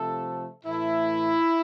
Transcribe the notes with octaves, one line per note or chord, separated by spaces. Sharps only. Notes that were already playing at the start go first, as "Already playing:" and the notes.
Already playing: C3 F3 A3 A4
A2 E3 A3 E4